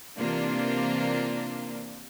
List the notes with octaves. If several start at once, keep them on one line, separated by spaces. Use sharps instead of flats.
C3 E3 A#3 D4 F4